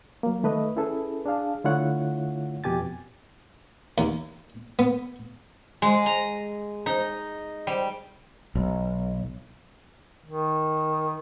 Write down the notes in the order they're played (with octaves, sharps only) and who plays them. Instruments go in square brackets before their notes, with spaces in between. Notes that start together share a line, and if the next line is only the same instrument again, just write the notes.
[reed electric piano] F#3 A#3
D#3 A3 B4 D#5
C#4 E4 G#4 A4 B4
D4 G#4 F5 A5
D3 A3 E4 F4 C#5 F#5
F2 B2 G4 G#5 A6
[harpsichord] D#2
B3
[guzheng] G#3
A#5
D#4
G3
[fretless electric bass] B1
[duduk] D#3